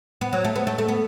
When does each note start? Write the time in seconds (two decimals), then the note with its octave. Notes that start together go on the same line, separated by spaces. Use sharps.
0.21 B3
0.33 F#3
0.44 A3
0.56 B3
0.67 A3
0.78 A3
0.88 B3